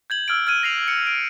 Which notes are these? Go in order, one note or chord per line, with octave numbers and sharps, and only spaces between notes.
G6 G#6 F#7
E6 F6 G#6 D7
F6 G#6 D#7
A#6 C7 F7
C#7
D7